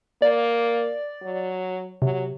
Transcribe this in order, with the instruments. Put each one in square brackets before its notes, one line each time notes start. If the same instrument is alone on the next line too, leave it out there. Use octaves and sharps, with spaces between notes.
[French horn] A#3 [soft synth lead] D5
[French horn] F#3
[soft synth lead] C3 [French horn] F#3